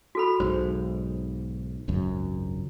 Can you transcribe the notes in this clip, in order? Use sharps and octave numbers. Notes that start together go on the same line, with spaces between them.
F#4 A4 B5
B1 G#2 C5
G#1 C#2 F#2